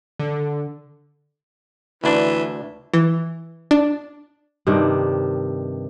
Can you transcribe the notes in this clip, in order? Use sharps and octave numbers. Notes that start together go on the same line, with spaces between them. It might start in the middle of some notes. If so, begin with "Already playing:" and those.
D3
D2 E3 D4
E3
D4
G2 C3 D#3 D4